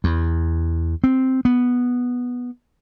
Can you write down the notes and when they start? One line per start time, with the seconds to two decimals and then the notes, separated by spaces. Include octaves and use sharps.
0.04 E2
1.04 C4
1.45 B3